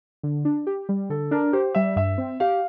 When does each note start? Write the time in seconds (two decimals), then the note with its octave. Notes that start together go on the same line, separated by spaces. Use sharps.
0.23 D3
0.45 D4
0.67 G4
0.89 G3
1.10 D3 A4
1.31 D4 A#4
1.53 G4 C5
1.75 G3 E5
1.96 G2 E5
2.18 C4
2.40 G4 F5